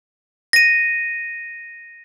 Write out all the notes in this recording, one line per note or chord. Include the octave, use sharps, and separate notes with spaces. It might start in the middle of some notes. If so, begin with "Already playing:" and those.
A#6 D#7